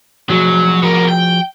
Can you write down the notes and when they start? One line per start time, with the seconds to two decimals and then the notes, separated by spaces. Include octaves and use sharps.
0.30 F3 F#3 F#4 G#4
0.82 B3 A#4
1.08 G5